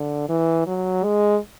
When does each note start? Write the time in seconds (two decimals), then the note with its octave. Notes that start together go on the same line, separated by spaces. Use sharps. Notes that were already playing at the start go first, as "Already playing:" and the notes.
Already playing: D3
0.29 E3
0.67 F#3
1.04 G#3